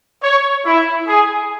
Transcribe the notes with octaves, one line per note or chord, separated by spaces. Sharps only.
C#5
E4
G#4